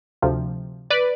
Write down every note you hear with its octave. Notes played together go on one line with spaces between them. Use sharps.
D2 C3 F3
B4 D5